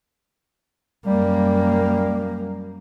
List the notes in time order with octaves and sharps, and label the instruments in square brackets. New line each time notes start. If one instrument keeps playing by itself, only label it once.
[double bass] F#2 A#3 [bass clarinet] G3